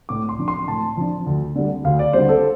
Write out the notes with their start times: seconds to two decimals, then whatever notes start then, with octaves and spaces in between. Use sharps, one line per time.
0.09 A2 D6
0.29 C6
0.39 F3 D4
0.48 C6
0.68 A2 A5
0.97 F3 D4
1.26 D2
1.55 D3 G3
1.84 D2 F5
1.99 D5
2.13 D3 G3 C5
2.29 A4